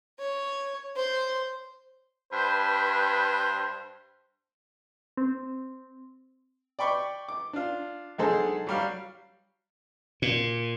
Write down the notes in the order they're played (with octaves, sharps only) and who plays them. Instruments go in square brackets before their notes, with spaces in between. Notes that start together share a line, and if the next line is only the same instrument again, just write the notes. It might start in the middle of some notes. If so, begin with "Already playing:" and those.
[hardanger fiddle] C#5
C5
[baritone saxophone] G2 [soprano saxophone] B4 [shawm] C5
[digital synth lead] C4
[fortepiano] D5 G5 B5 C#6 D6
D6
D4 F4
B1 D3 G#3 G#4 A4 C5
F#3 G3 F5
[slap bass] A#2